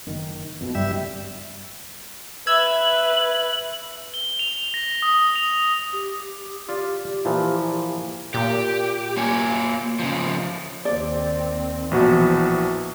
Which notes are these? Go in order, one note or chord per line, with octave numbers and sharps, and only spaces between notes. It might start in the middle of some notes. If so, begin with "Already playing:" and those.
F#1 D#3
F2 B2
F#1 G2 G3 E5
B4 E5 E6 G#6 F#7
G7
F7
A#6
D#6
F7
G4
F4 G4 D5
A#2 E3 F3
A#2 G4
A#3 C#5 G#5
C#3 F3
D#2 C4 D5
A#1 E2 B2 E3 F3 F#4